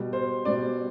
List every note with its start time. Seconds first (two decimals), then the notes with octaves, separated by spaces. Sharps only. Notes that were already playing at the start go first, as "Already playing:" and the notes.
Already playing: B2 G3
0.13 C5
0.45 B2 G3 D5